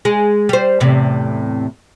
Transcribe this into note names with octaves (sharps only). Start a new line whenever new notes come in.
G#3
G3 C5
E2 A2 C3